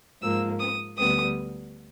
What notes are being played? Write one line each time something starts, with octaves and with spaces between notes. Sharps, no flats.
G#2 F3 A#3 E6
D#6
D2 D3 G3 B3 D#6